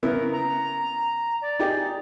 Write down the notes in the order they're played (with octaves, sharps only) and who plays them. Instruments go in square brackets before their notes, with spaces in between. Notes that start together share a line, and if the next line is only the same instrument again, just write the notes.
[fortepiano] C#3 B3 E4 [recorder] A#4
[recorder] A#5
D5
[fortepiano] D#4 G4 G#4